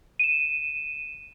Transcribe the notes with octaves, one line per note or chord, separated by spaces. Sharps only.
D#7 E7